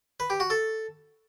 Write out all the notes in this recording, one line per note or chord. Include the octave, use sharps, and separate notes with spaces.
B4
G4
F#4
A4